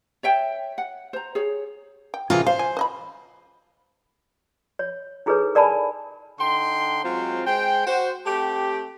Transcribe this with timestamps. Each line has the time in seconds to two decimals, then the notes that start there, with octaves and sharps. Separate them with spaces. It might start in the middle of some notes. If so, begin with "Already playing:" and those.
0.23 C#5 E5 G5
0.78 F#5
1.13 C5 A#5
1.35 G#4 C#5
2.14 G5
2.30 C3 E3 C#4 F4 G#4 A#4
2.46 C5 F5
2.59 G#5
2.77 B4 D#5 B5
4.79 C#5
5.26 D#4 E4 G#4 A4 B4 C#5
5.55 A#4 D5 G#5 A5 B5
6.39 D3 D#4 G5 C6
7.03 F#3 G#3 C4 F4 C5
7.46 G#3 C5 G5
7.87 F#4 C5
8.26 A3 C4 G4